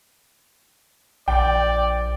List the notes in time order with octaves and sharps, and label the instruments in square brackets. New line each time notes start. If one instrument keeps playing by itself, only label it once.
[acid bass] A#1 [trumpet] D5 [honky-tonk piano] G5